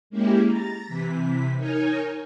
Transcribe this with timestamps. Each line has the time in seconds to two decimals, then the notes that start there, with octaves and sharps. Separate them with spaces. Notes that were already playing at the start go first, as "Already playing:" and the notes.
0.10 G#3 A#3 C#4 E4 G4
0.45 A#5 A6
0.86 C3 E3 B6
1.57 D#4 A#4 C#5 G#5